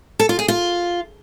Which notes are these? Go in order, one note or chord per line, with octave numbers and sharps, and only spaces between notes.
A4
F4
G#4
F4